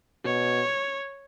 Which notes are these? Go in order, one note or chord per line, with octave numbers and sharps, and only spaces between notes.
B2 C#5